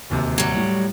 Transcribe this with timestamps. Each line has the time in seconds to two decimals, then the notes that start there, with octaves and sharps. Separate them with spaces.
0.10 D1 D#2 C3
0.38 F#3 G3
0.57 A2